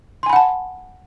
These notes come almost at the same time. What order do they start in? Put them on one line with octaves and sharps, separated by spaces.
C6 G#5 B5 F#5 A5